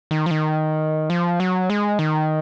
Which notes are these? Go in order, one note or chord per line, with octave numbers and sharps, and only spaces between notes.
D#3
F3
D#3
F3
F#3
G#3
D#3